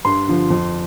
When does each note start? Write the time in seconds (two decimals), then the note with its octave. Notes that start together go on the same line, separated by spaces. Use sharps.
0.05 G2 C6
0.28 D3 F3
0.50 F2